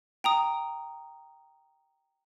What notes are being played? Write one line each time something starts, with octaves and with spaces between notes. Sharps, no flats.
G5 A#5 D#6